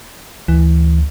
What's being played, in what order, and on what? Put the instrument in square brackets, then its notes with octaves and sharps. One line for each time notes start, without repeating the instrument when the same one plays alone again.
[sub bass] D2 [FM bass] E3